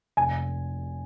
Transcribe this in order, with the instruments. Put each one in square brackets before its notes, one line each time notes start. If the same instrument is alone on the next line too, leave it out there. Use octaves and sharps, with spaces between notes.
[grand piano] F1 G#5